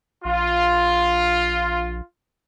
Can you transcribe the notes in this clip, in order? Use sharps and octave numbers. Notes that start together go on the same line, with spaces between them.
A#1 F4